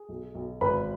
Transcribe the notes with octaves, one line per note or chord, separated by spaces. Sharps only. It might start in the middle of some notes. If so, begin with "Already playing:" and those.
Already playing: G#4
B1
B1
G#1 B4 B5